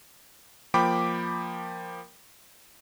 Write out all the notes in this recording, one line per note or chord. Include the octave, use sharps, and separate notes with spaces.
F3 A#3 G5 B5 D6